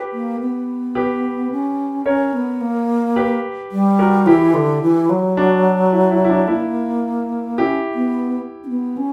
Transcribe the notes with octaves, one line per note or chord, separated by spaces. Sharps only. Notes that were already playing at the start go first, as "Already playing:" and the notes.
Already playing: G4 B4
A#3
B3
G4 B4
C#4
C#4 A#4 C#5
B3
A#3
G4 B4
G3
F#4 A#4
E3 E4 G4
D3
E3
F#3
D4 F#4
E4
E4
E4
D4
A#3 E4
C#4 E4 G4
B3
C#4
B3
C#4